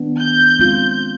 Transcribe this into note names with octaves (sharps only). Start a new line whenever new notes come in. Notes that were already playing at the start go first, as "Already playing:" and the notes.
Already playing: D#3 G3 B3 D4
G6
G#3 C4 F4